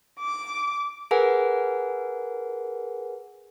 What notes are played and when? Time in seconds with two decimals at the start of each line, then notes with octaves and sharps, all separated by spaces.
0.20 D6
1.11 G#4 A#4 B4 F#5 G#5